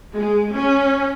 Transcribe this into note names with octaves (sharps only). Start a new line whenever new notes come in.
G#3
C#4